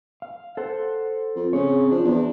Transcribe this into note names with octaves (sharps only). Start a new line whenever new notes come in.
F5
A4 C5 F#5
F2
C#3 C4 C#5
F3 D4
E2